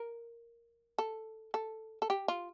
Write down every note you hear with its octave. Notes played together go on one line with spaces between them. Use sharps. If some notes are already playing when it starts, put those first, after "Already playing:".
Already playing: A#4
A4
A4
A4
G4
F4